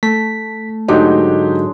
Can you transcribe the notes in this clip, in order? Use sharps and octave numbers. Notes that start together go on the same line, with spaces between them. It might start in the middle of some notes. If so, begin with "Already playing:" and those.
A3 B6
G#2 D3 F#3 G#3 D4 D#4 G4